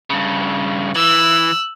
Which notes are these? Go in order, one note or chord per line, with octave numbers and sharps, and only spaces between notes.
G2 C#3
E3 E6 F#6